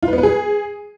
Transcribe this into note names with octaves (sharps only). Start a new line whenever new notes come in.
F4
B4
B3
B4
G#4